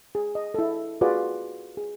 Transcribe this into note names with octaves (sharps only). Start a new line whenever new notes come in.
G#4
D#5
E4 A4
F4 F#4 G#4 B4 D5
G#4